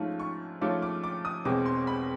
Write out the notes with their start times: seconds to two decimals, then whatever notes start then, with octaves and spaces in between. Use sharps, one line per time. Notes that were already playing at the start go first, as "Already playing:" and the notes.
Already playing: G#2 F3 A3 C#4 F4
0.20 C#6
0.61 G#2 F3 A3 C#4 F4 D6
0.82 D6
1.04 D6
1.25 D#6
1.45 E1 E2 B2 G#3 C4 D6
1.66 C6
1.87 B5